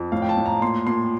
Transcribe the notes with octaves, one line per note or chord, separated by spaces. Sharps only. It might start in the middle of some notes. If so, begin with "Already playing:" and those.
Already playing: F2
A2 F5
G5
A5
A2
A#5
A#2 C6
A#2 C6